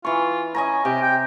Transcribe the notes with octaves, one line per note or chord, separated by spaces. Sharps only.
E3 F4 C#6
C#4 D#5 G#5 A#5
C3 G4
G5